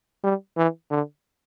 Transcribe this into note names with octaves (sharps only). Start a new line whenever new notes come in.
G3
E3
D3